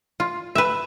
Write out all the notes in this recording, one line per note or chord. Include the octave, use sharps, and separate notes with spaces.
F4
B4 E5